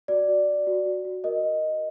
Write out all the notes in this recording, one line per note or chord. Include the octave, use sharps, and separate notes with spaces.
F#4 D5
F#4
F#4
F#4
F#4
F#4
A#4 D#5